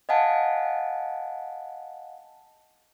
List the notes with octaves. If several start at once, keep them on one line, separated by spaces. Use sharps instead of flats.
D#5 F5 F#5 G#5 A5